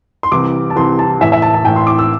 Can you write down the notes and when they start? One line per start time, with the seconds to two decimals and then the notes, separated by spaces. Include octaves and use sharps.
0.23 C6
0.31 C2 C3 E3 D6
0.70 A5
0.76 C2 C3 E3 C6
0.99 A5
1.20 A1 A2 E3 E5
1.32 E5
1.42 A5
1.54 A5
1.64 A1 A2 E3 G5
1.76 C6
1.87 D6
1.99 E6